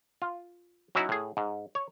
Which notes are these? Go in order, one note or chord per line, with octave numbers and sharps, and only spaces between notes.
F4
F#3 C#4 D#4 E4 F#4
A2 G#4
G#2
C#5